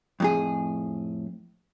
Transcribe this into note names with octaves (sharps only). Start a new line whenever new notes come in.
F2 A2 G#4